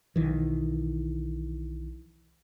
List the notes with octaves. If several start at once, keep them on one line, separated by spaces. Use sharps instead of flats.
B1 D#3 E3